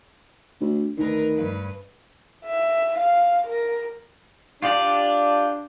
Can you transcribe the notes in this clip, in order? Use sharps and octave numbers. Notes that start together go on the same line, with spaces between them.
D2
D2 D#3 A#4 B4
G2 B4
E5
F5
A#4
D4 F4 G4 D5